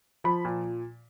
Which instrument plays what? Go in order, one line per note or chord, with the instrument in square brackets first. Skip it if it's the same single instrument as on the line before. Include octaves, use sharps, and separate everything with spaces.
[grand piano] F3 B5
A#2